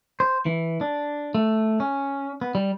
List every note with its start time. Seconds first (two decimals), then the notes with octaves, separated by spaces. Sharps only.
0.20 C5
0.46 E3
0.81 D4
1.35 A3
1.80 C#4
2.41 B3
2.55 G3